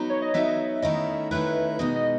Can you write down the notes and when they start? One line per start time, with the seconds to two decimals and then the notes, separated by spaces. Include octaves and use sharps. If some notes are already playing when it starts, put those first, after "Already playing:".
Already playing: F#3 B3 D#4
0.10 C#5
0.22 D#5
0.34 F#3 B3 D#4 E5
0.82 D#3 A3 C#4 E4 D#5
1.31 D#3 A3 C#4 E4 B4
1.79 B2 G#3 B3 D#4 D#5
1.96 D#5